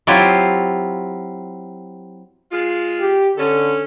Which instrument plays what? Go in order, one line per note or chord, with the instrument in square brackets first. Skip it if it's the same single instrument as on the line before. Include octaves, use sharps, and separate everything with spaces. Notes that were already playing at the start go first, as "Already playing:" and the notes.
[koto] F#3 C4 E4 F4 G4
[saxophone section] G#3 F4
[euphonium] G4
[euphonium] D3 [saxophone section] C#4 A4